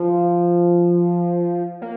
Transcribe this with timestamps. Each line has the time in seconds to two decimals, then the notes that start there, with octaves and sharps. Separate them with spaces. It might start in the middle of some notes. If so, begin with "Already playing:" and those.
Already playing: F3
1.82 A#3